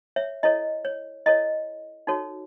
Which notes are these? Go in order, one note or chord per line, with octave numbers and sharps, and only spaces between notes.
C#5 E5
E4 A4 C#5 D#5
C#5
E4 A4 C#5 D#5
D#4 F#4 A4 C#5